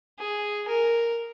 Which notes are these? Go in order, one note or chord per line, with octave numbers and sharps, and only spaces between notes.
G#4
A#4